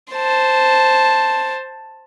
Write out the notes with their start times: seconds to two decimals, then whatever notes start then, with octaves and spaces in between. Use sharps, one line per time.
0.12 C5 A5